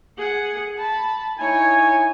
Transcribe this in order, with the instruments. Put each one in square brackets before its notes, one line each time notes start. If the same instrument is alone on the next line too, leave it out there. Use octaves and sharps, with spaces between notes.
[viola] G#4 F#5
A5 B5
[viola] D#4 C#5 [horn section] E4 G#5